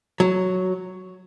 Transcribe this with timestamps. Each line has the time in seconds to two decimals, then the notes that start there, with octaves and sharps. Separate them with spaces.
0.20 F#3